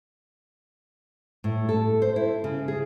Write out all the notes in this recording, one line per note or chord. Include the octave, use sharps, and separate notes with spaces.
A2
A4
C5
E4
C#3
G#4